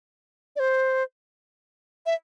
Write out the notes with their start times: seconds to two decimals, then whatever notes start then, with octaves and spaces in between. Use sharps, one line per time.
0.56 D5
0.60 C5
2.06 E5